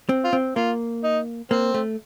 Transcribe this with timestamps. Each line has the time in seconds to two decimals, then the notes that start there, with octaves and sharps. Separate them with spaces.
0.09 C4
0.24 F4
0.33 C4
0.56 A#3 F4
1.04 D#4
1.51 A#3 C4
1.74 A3